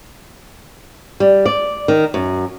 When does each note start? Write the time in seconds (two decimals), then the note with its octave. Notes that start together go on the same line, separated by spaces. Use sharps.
1.20 G3
1.46 D5
1.88 D#3
2.14 F#2